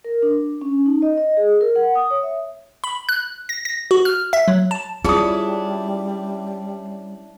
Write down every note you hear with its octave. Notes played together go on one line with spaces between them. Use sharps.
A#4
D4
C#4
D#4
D#5
D#5
G#4
A#4
F#5
D#6
C#5
E5
B5
F#6
A#6
A#6
F#4
F6
E5
F#3
A5
G3 C#4 D4 E4 F4 G#4 D#6